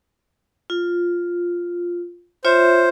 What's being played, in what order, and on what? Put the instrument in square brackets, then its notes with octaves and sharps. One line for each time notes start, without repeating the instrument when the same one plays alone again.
[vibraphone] F4
[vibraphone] F4 C#5 E5 [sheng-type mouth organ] C5